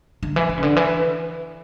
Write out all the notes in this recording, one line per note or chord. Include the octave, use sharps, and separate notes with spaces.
D3
E3
E3
C#3
D3
E3